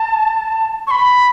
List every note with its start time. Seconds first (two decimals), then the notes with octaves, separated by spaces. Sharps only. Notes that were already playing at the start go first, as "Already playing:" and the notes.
Already playing: A5
0.87 C#6
0.91 B5